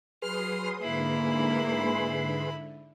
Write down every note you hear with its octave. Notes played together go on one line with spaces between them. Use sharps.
F#3 G#4 B4 C6 D#6 F6
G#2 D3 A#3 E4 B5